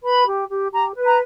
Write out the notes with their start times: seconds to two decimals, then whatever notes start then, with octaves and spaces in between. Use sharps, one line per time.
0.03 B4 B5
0.27 G4
0.49 G4
0.72 G4 A#5
0.95 B4
1.07 A#5